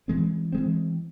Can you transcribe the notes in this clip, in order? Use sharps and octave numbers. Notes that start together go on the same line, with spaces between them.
E3 G#3 C4
E3 G#3 C4